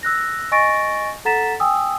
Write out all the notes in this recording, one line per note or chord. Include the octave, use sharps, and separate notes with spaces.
E6 F#6 A#6
D#5 G#5 C#6 A6 A#6 D7
A4 F#5 A#5 A6 B6 E7
G5 G#5 D#6 E6